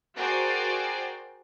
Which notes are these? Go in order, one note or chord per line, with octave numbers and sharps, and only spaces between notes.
F#4 G#4 A#4 C5 D5 G5